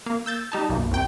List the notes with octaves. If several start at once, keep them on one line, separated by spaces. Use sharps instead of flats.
A#3 F5
E6 G6 A6
G3 D#4 A5
B1 F#2 A#3
C2 G5